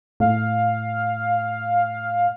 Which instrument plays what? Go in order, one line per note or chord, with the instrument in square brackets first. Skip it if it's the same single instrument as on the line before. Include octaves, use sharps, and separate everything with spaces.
[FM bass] A2 [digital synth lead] F5